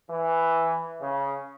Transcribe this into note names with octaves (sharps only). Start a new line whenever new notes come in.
E3
C#3